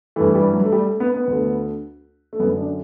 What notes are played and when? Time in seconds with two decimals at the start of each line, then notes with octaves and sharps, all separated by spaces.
0.16 G2 E3 A3
0.35 G3
0.53 F#3
0.64 A3
0.72 G3
0.86 A3
1.00 B3
1.14 B3
1.28 D2 D3
2.33 A3
2.39 F#2 D3 B3
2.58 D4